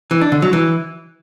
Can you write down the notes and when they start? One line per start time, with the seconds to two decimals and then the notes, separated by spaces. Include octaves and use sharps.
0.11 E3
0.21 D4
0.32 D3
0.42 F#3
0.53 E3